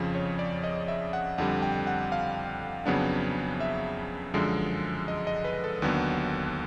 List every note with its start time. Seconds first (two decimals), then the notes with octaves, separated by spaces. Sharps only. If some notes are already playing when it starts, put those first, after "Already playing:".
Already playing: F2 C#3 F3
0.15 C#5
0.39 D5
0.64 D#5
0.88 E5
1.13 F#5
1.38 F2 D3 G3 F#5
1.62 G5
1.87 F#5
2.12 F5
2.86 F2 C#3 F#3 B3 D4
3.60 E5
4.34 F#2 D3 F3 G#3
5.08 D#5
5.27 D#5
5.45 B4
5.64 A4
5.82 D#2 D3 F#3 B3